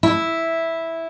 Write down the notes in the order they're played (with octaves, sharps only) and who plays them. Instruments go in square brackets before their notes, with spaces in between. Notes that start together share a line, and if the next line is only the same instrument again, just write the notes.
[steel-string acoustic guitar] E4